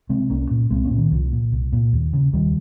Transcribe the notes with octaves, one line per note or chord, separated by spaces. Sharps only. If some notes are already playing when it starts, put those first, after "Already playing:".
C3 G#3 C4
C2 A#3 C#4
A#2
C2 G#3 C4
A#3 C#4
A#2
D#3
C2 F3
A#2
C2
A#2
D#2
C#3
D#2 D#3 G3